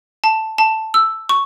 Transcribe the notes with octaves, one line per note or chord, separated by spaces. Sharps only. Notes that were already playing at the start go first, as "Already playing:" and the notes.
A5
A5
E6
C#6